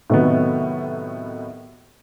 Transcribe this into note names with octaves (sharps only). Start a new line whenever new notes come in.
A2 C3 D#3 F#3 B3